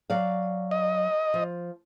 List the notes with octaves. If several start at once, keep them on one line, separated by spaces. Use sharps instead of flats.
F#3 D5 F5
D#5
F3